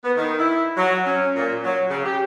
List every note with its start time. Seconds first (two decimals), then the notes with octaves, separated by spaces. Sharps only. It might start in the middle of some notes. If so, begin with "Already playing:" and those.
0.04 B3
0.17 D#3
0.39 E4
0.77 F#3
1.06 C#4
1.36 A#2
1.64 F#3
1.90 C#3
2.05 G4